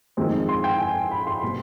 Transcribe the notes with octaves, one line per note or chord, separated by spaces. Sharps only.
F2 D#3 G#3 C4
C6
G5
G#5
B5
C6
B2 G3 C4